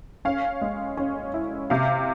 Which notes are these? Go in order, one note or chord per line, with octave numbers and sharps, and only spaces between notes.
C#4 F5
G#3
C#4
E4
C3 F5